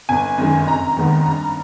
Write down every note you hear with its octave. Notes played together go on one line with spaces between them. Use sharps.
G1 G#5
F#2 D#3 G#3
F1 A#5
D#2 D#3 G#3 B3
G2 A#5